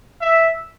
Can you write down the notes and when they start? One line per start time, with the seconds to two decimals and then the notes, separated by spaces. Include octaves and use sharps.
0.21 E5